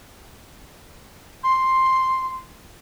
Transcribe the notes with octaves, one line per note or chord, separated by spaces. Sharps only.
C6